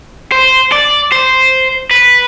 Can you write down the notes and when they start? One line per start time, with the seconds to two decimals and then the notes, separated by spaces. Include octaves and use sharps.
0.32 C5
0.72 D5
1.12 C5
1.91 B4